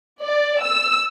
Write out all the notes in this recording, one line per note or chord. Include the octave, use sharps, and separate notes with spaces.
D5
E6